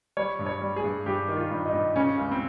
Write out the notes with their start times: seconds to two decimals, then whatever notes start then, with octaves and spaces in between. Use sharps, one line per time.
0.17 G3 C#5
0.39 G2
0.46 C#5
0.61 G3
0.76 G#4
0.84 G2
1.06 G2 G4
1.28 D#3
1.36 F4
1.51 G2
1.65 D#4
1.73 G2
1.96 C#3 C#4
2.17 C#2
2.31 C4